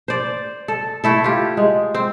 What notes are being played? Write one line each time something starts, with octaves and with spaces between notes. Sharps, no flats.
C5 D5
A4
A3 E4 A4
F4 G4
G#3
C4